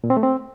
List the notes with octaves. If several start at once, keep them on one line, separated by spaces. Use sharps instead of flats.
A#2
C4
A3
C4